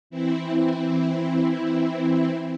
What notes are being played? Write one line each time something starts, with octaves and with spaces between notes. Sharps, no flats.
E3 C4 E4